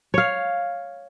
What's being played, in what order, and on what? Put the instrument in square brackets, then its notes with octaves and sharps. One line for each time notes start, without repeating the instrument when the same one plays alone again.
[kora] C#5 F5